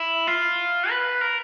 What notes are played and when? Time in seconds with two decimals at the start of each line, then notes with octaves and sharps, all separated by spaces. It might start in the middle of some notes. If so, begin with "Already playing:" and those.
Already playing: E4
0.27 F4
0.90 B4
1.21 A#4